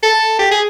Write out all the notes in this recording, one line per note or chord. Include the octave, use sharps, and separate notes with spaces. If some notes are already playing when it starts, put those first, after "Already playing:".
A4
G4
G#4